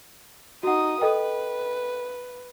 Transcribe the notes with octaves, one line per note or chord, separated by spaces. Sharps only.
D#4 F#4 F#5 D#6
A4 B4 D#5 G5